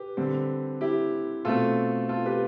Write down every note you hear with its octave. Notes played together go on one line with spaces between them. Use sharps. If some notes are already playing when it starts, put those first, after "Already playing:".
Already playing: G4 B4
D3 G3 C4
E4 G4
B2 A3 C4 F4 A4
F4 A4
G4 B4